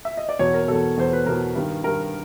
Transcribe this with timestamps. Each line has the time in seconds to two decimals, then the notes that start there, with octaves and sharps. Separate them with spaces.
0.05 E5
0.17 D#5
0.29 D5
0.39 E2 B2 C#5
0.54 A#4
0.68 E2 B2 A4
0.97 E2 B2 C5
1.13 B4
1.26 E2 B2 A#4
1.55 G2 D#3
1.84 G2 D#3 A#4